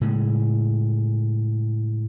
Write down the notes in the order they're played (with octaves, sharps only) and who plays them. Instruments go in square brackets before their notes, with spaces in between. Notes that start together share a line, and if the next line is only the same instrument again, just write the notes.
[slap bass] A2 C#3 G#3